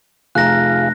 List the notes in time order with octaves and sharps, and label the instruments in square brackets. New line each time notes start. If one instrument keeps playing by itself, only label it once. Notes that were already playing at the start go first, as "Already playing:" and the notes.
[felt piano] F1 A#5 [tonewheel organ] F4 G#4 F5 [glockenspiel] F#6 A#6